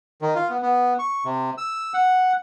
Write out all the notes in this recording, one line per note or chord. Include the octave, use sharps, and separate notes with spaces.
D#3
F4
B3
B3
C#6
C3
E6
F#5